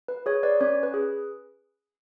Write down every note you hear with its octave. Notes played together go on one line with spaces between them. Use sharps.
B4
G#4 C#5
B4 D5
C#4 C#5
B4
G#4